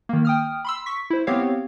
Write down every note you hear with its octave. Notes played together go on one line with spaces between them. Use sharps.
D#3 A#3
G5 D#6 F6
B5 C6 E6
C#6 B6
E4 C5
B3 C4 G4 C#5 F5